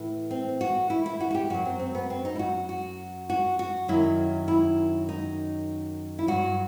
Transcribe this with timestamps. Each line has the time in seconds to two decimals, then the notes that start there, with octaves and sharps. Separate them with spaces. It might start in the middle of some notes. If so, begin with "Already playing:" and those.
Already playing: A2 E3
0.31 C4
0.61 F#4
0.90 E4
1.06 E4
1.20 F#4
1.31 F#4
1.35 G4
1.50 F#2 F#3 F#4
1.65 C4
1.80 C4
1.95 B3
2.10 C4
2.25 D#4
2.35 E4
2.39 F#4
2.69 F#4
3.30 F#4
3.59 F#4
3.88 F#2 D#3 F#3 E4
4.48 E4
5.09 D#4
6.19 E4
6.27 G2 F#3 F#4